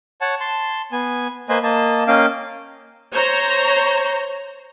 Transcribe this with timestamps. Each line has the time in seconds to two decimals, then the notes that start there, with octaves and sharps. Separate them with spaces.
0.21 C#5 F#5 A5
0.40 A5 C6
0.92 B3 G#5
1.49 A#3 B4 C5 D#5 G#5
1.63 A#3 D#5 A5
2.08 A#3 C#4 D#5 F5 G5
3.12 C5 C#5 A#5